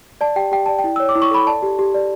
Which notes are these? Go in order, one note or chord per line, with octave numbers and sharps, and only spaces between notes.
D5 A5
G4 G5
G4 G5
D5 A5
G5
E4
C#5 E6
D6
E4
C#6
A4 B5
D5 A5
G4
G4
D5